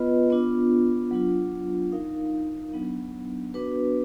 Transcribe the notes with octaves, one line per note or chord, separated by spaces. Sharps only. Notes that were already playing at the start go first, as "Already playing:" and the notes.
Already playing: B3 F4 B4 D#5
B3 D4 F4
F#3 D4 F4
D#4 A#4 F5
F#3 B3 D4
B3 D4 F#4 B4